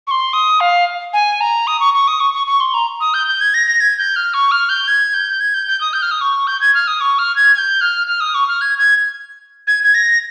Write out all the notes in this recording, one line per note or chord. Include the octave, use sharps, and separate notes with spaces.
C#6
C6
D#6
F5
G#5
A#5
D#6
C#6
C#6
D#6
C#6
C#6
C#6
C6
A#5
D#6
G6
G6
G#6
A#6
A#6
G#6
G6
F6
C#6
F6
G6
G#6
G6
G#6
G6
G6
D#6
G6
F6
D#6
C#6
G6
G#6
F6
D#6
C#6
F6
G#6
G#6
G6
F6
F6
D#6
C#6
F6
G#6
G#6
G#6
G#6
A#6